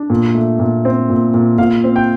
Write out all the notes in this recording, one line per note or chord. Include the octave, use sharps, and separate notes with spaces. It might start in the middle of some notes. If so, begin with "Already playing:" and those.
Already playing: D4
A#2
A3
A#2
C4
A#2
A#2
A#2 F5
C4
G5